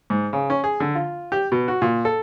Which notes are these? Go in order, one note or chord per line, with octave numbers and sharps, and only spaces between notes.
G#2
C#3
C#4
G#4
D3
F4
G4
B2
F#4
A#2
A4